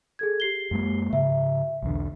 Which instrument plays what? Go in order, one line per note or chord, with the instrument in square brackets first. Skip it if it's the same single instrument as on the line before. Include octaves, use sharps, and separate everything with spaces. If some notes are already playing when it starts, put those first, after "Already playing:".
[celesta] G#4 A4 G#6
G4 C7 G7
[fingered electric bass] F#2 G#3 A#3
[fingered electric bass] G#2 C#3 [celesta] E5
[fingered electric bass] B1 E2 D3